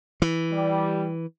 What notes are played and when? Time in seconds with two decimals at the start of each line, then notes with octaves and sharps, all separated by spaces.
0.22 E3
0.52 G3